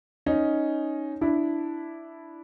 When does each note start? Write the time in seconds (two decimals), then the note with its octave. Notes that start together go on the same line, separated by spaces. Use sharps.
0.26 C#4 D#4
1.21 D4 E4